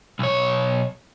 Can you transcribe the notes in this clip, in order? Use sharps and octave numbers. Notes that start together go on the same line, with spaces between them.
B1 C#5